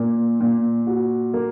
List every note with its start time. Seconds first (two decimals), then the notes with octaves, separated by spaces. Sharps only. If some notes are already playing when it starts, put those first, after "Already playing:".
Already playing: A#2
0.40 A#2
0.87 F#4
1.34 A#3